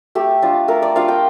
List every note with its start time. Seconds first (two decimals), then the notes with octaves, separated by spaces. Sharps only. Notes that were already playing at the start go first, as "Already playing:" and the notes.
0.15 A3 G4
0.42 D4 F4
0.68 A3 A#4
0.82 D5
0.96 D4 F4 F5
1.08 G5